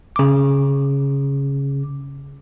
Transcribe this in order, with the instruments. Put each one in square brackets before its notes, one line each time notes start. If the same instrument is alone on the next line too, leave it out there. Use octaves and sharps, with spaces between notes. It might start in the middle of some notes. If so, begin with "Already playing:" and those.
[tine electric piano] C#3 D6